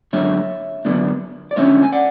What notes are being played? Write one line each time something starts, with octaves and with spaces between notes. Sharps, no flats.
F#2 D3 G#3 C#5 E5
F#2 D3 G#3 B3 D4
D5
D3 G#3 C#4 C#5 E5
G#5
D5 F#5